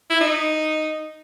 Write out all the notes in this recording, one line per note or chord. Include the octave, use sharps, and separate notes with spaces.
E4
D#4